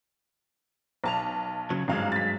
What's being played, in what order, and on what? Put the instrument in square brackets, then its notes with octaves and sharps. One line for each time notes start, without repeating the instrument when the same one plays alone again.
[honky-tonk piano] B1 A5 F7
[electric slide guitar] C#3 F#3
[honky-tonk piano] G#1 F5 [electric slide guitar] G2 F#3 G#3
[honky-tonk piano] A6 B6